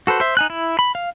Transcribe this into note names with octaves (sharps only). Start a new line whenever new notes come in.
F#4 A4 B4 C5
C5 E5
D#4 G#5 F#6
E4
B5
F5